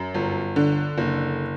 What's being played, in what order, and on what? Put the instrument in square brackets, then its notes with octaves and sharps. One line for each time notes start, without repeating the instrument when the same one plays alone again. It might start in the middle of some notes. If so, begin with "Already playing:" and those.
Already playing: [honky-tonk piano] F#2
G1
D3
F#1